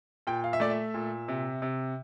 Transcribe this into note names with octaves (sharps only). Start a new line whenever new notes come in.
A#2 G5
F5
E5
A3 D5
E5
A#2
C3
C3